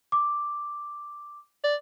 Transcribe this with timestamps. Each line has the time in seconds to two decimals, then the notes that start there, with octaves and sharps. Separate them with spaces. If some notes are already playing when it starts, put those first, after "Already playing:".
0.12 D6
1.64 D5